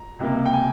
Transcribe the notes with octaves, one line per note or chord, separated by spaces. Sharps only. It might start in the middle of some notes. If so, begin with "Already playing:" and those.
Already playing: A#5
C#2 C3 G3 A#3
G5
G#5